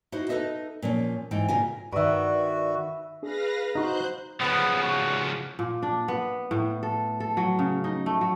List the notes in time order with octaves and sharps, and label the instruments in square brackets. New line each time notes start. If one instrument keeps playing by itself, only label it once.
[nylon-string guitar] D#4 E4 F#4 C5
D#4 A4 B4 D#5 E5
A#2 F3 C#4
G#2 E3 D#4 G5
A#2 C#3 F4 A#4 G#5
[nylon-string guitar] G2 D#3 [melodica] F#4 [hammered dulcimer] B4 E5 [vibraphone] D5
[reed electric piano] D4 G#4 [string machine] B4 F5 A#6
[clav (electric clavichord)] D#4 F#4 [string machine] C5 F#6 G6 [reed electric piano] A#5 B5
[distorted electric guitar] C#3 F3 [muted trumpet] B3
[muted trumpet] F#4
[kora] A#2
D4
B3
A2
A4
A4
F#3
C#3
D#4
A3
F#3